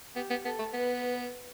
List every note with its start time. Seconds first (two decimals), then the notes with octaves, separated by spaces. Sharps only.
0.15 B3 G4
0.30 B3
0.45 B3 A4
0.59 A3
0.73 B3 B4